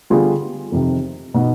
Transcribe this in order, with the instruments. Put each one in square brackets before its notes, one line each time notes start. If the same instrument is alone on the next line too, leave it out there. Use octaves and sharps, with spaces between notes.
[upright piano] D3 G3 B3 F4 G#4
F2 C3 D#3
B2 B3 D#4